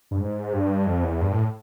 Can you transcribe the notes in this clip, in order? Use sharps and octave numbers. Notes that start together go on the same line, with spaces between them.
G2
G#2
G2
F2
E2
G2
A2